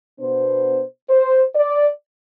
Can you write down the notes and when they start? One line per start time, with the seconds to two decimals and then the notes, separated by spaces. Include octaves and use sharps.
0.19 B2 B3 D4 C5
1.10 C5
1.55 D5